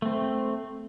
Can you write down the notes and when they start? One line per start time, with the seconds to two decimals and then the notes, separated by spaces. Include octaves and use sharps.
0.02 A3 C4